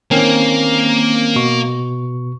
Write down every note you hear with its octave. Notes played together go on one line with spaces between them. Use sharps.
D#3 A#3 C4 C#4
B2 C#6